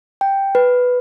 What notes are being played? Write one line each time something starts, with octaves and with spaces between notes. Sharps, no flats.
G5
B4